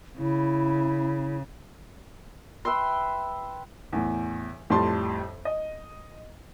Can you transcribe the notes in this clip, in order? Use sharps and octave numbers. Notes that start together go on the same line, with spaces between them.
C#3 E4
B4 E5 G5 C6
E2 A2
F2 A2 G3 A5 C6
D#5